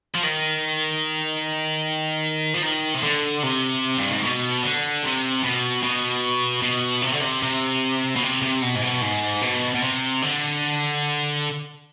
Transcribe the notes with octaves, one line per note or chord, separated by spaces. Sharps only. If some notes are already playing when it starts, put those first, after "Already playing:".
F3
D#3
F3
D#3
C3
D3
C3
G2
G#2
B2
D3
C3
B2
B2
B2
C3
D3
C3
C3
B2
C3
C3
B2
G#2
B2
G#2
B2
B2
C3
D3